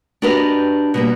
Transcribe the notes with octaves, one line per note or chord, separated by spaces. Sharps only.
D4 F#4 G4 A#4 B4 D#5
B2 G3 A#3